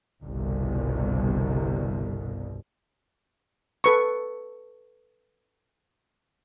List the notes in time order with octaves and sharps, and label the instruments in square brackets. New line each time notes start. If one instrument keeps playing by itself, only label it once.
[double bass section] G1 C2 B2
[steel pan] A4 B4 C#6